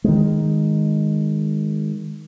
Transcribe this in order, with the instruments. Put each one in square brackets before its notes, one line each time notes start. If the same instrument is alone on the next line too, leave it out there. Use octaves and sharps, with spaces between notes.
[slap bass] D#3 G#3